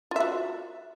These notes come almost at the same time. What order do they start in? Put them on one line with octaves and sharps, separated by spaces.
F4 E5 F#4